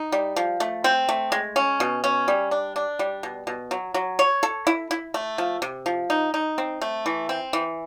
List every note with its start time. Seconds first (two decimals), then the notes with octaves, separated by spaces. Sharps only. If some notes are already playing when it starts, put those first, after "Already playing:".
Already playing: D#4
0.12 G3
0.36 F3
0.60 A3
0.84 C4
1.09 A3
1.32 G#3
1.56 C#4
1.80 B2
2.04 C#4
2.28 G3
2.51 D4
2.76 D4
2.99 G3
3.23 B2
3.47 B2
3.71 F#3
3.94 F#3
4.19 C#5
4.43 A4
4.67 E4
4.91 E4
5.14 A3
5.38 F3
5.62 C3
5.86 F3
6.10 D#4
6.34 D#4
6.58 C4
6.82 A3
7.06 E3
7.29 C4
7.53 E3